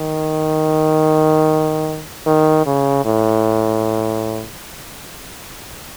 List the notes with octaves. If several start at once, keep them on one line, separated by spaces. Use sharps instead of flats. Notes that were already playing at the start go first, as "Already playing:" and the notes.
Already playing: D#3
D#3
C#3
A2